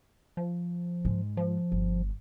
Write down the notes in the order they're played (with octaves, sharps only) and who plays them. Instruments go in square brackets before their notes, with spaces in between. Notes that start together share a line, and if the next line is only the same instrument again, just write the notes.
[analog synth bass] F3
[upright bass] G#2 G#3
[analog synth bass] F3
[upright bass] G1